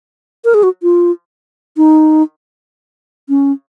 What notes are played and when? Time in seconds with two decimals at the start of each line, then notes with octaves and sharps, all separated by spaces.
0.45 A#4
0.54 G#4
0.63 F#4
0.83 F4
1.77 D#4
3.29 C#4